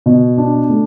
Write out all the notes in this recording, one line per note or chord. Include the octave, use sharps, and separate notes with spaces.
B2
D4
A3